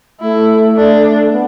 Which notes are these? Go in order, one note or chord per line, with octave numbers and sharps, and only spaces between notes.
A3 E4
D4
B3